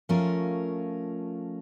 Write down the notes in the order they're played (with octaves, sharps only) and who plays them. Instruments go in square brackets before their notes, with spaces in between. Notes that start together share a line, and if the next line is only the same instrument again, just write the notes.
[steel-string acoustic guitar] F3 A3 C#4 F4 A#4